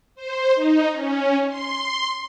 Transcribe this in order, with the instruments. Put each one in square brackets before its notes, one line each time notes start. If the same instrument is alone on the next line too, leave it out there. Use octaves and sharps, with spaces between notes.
[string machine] C5
D#4
C#4
C6